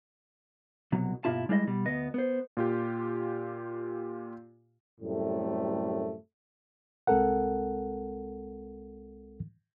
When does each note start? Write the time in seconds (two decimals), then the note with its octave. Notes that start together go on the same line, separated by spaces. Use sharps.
0.92 C2 B2 F#3
1.24 G2 B2 A#3 E4 F4 A5
1.49 G3 G#3 E4 D5 D#5
1.67 B2 G3
1.85 D2 B3 D#5
2.14 B3 C5
2.57 A#2 F4 G4
5.01 F#2 A2 C3 G3 A3
7.07 C2 G#3 C4 A4 A#4 F#5